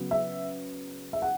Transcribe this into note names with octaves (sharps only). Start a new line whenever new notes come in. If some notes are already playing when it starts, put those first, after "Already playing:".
Already playing: C#3 F#3 B3
E5
E5
F#5